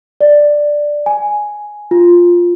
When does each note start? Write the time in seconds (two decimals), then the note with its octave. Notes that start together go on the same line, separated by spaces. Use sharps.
0.21 D5
1.06 G#5
1.91 F4